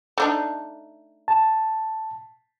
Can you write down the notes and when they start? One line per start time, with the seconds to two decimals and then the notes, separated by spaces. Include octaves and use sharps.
0.18 A3 D4 D#4
1.28 A5